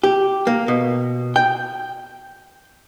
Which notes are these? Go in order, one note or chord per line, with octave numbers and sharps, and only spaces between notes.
G4
A#3
B2
G5